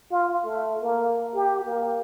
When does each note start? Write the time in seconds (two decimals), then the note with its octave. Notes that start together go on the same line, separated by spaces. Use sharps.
0.11 F4
0.44 A3
0.82 A#3
1.34 G4
1.65 A#3